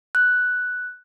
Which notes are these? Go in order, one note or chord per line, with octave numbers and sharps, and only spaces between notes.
F#6